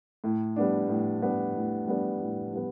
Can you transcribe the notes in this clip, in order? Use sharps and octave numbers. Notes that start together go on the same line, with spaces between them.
A2
G3 B3 D4
A2
G3 B3 D4
A2
G3 B3 D4
A2
G3 B3